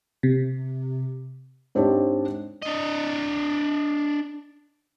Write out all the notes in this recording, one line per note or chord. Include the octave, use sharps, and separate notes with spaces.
C3
G#2 C4 D4 G4 C#5
D4 D#5